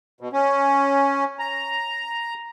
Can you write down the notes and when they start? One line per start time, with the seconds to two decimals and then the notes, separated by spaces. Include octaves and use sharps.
0.21 B2
0.33 C#4
1.39 A#5